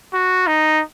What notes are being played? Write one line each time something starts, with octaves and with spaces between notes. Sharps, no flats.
F#4
D#4